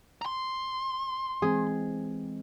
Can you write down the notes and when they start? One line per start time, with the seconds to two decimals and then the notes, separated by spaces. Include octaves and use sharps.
0.22 A#5 C6
1.42 E3 G#3 C4 G#4